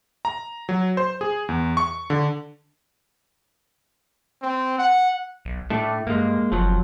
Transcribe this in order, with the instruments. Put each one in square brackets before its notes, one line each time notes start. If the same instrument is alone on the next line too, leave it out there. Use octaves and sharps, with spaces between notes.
[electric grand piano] A#5
F#3
C5
G#4
E2
C#6
D3
[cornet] C4
F#5
[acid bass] B1
[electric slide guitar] A2 A3 [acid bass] D4
[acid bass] G2 [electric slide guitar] G#3 A#3
[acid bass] F#1 [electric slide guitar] F3 F#3